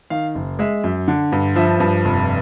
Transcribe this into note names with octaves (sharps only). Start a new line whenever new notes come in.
D#3 F5
F#1
G#3 E5
F#2
D3
G2
F3 E5
G2
F1